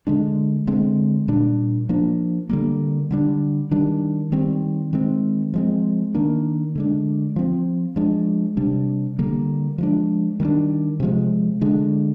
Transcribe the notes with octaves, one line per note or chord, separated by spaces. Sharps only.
D3 G#3 D4
D3 G#3 C4
A#2 G3 D4
F3 A#3 D4
D3 G3 A#3
D3 G3 D4
D#3 G3 D4
D#3 G3 C4
D#3 G#3 C4
F3 G#3 C4
D#3 A#3 D4
D3 G#3 D4
F3 C4
F3 G#3 D4
C3 G3 D4
D3 G3 A#3
F3 G#3 D4
D#3 G3 A#3 D4
C3 F3 G#3
D3 G#3 D4